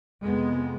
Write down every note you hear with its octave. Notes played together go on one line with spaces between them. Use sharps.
F2 C3 G#3 B3